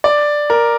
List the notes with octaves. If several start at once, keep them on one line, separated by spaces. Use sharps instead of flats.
D5
A#4